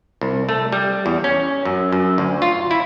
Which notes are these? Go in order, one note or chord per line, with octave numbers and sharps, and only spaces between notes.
C2
A3
G3
E2
C#4
F#2
F#2
D2
F4
E4